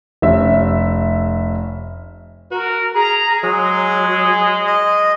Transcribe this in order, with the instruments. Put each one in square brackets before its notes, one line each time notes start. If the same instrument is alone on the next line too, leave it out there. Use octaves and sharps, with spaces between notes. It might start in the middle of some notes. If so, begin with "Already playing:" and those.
[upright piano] F1 C#4 E5
[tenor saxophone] F#4 [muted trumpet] A#4
[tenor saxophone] G#4 [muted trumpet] A#5
[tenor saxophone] F#3 [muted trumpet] G#3 [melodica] G#4
[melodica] D#5